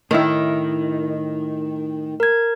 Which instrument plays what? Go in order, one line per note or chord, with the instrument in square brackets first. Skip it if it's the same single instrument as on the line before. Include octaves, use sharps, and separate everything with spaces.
[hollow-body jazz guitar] A2 E4 [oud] D#3
[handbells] A#4 G#6